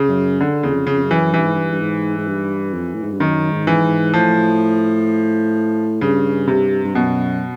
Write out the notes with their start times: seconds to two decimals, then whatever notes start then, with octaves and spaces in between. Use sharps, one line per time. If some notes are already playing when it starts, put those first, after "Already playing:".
Already playing: C#3
0.09 F#2
0.41 D3
0.63 E2 C#3
0.71 F2
0.87 C#3
0.97 F2
1.03 F#2
1.11 E3
1.33 G2 E3
1.44 G#2
1.55 G2
1.72 G2
1.80 G#2
2.18 G#2
2.27 G2
2.73 F2
2.95 A2
3.03 G#2
3.12 G2
3.20 F#2 D#3
3.52 G#2
3.67 E3
3.83 G#2
4.13 A2 F3
6.01 G2 C#3
6.48 C3
6.85 G2
6.95 F#2 B2